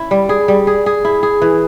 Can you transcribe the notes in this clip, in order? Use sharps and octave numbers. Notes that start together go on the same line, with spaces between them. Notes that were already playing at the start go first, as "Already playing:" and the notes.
Already playing: C#4 E4
G3
G#4
G3
G#4
G#4
E4
G#4
E3